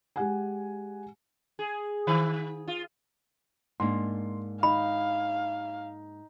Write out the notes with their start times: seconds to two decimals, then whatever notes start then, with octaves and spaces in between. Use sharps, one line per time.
0.16 G#3 G4 F#5 G#5
1.59 G#4
2.07 D#3
2.68 F4
3.80 G#2 A#3 D4 C6
4.63 D#4 F5 B5